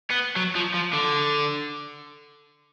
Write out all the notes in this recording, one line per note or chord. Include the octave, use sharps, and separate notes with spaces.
B3
F#3
F3
F3
D3